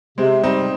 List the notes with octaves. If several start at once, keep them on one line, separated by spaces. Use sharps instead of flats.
C3 G#3 C4
G3 C4 D#4